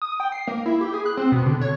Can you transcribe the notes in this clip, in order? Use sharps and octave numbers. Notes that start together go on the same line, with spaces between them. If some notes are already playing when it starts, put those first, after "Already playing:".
D#6
G5
C7
A#3
E4
G4
G#4
F#6
C4
B2
D3
C#5